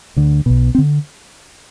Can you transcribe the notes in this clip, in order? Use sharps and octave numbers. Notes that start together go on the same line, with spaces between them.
D2 D3
B1 B2
C4
D3